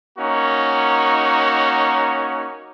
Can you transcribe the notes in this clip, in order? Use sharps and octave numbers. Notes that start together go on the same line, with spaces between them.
A#3 C#4 D#4 F#4